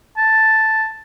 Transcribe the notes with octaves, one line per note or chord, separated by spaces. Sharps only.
A5